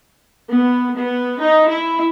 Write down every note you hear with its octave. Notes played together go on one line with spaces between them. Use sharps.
B3
B3
D#4
E4